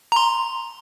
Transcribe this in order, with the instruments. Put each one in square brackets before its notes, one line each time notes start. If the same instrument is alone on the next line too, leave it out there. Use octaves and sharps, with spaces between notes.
[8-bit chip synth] A#5 C6